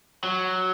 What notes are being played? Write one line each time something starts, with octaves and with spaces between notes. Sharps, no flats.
F#3